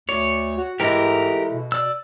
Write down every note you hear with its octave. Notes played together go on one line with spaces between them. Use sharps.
D2 C#5 D5
F#4
G#2 E3 G#3 A3 G4 A#4
B2
D5 E6